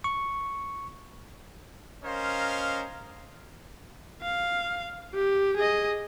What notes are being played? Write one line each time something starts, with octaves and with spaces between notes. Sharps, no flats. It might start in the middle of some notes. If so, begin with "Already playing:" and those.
C#6
C#4 A#4 C5 D#5 F5
F5
G4
G#4 D#5